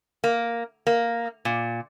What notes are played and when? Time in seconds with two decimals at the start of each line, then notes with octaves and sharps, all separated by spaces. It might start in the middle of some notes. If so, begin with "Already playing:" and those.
0.24 A#3
0.87 A#3
1.45 A#2